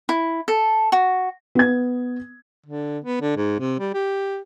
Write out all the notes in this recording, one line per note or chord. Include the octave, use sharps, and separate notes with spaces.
E4
A4
F#4
B3 G#6
D3
B3
D3
G#2
C3
G3
G4